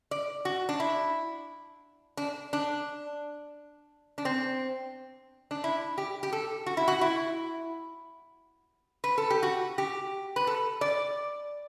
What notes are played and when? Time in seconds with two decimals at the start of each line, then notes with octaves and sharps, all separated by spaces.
0.11 D5
0.45 F#4
0.69 D4
0.80 E4
2.17 D4
2.53 D4
4.18 D4
4.25 C4
5.51 D4
5.64 E4
5.98 G4
6.23 G4
6.33 A4
6.66 F#4
6.77 E4
6.88 F#4
7.01 E4
9.04 B4
9.18 A4
9.30 G4
9.43 F#4
9.78 G4
10.36 B4
10.47 A4
10.81 D5